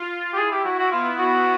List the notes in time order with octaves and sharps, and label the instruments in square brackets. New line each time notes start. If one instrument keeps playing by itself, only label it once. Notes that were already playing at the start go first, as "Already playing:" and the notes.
Already playing: [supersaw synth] F4
[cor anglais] G4
[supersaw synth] E4 [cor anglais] G#4
[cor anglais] G4
F#4
F#4
[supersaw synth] B3 [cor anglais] F4
[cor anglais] F#4